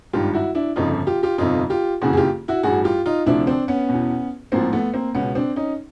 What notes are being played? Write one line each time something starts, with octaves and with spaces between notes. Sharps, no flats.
G#1 G2 D#3 F4 G4
E4 F#4
D4 E4
G1 F2 C#3 F3 D#4 F4
F4 G4
F4 G4
G1 F2 C3 D#4 F4
F4 G4
F#1 F2 C#3 E3 F#4 G#4
G#4
F4 G4
E4 F#4
A1 G2 E3 F#4 G#4
F4 G4
D#4 F4
D2 C3 F3 D4 E4
C4 D4
B3 C#4
B2
E2
A1 G#2 F3 A#3 C4
A3 B3
A#3 C4
C#2 B2 B3 C#4
C4 D4
C#4 D#4